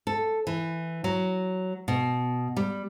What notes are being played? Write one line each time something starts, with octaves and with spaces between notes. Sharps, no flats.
A4
E3
F#3
B2
G3